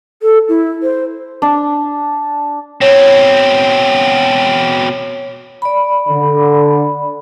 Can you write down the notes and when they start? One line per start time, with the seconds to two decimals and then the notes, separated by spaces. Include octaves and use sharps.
0.22 A4
0.49 E4
0.83 C5
1.42 D4
2.81 B2 C4 C#5
5.62 D5 B5
6.09 D3